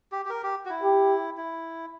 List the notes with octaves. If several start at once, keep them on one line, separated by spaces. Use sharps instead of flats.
G4
G4
A#4
G4
F#4
E4
G4
E4